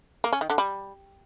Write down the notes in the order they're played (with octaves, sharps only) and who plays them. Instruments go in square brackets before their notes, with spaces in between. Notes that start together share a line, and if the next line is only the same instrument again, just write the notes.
[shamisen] A#3
C#4
D#3
D3
G3